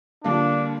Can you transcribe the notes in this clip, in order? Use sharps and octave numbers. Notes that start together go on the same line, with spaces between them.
D3 G3 A#3 D4 F4